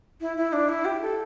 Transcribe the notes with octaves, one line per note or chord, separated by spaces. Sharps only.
E4
E4
D4
E4
G4
A4